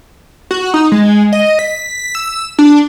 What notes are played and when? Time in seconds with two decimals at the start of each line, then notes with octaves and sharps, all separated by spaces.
0.51 F#4
0.74 D#4
0.92 G#3
1.33 D#5
1.59 B6
2.15 E6
2.59 D4